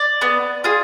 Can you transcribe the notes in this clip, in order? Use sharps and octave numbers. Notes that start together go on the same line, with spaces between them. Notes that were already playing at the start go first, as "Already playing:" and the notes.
Already playing: D5
B3
F4 G#4